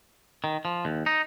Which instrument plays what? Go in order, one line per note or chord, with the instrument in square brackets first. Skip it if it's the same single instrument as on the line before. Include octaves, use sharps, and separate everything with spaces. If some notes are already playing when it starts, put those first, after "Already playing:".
[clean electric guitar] D#3
F3
D#2
D#4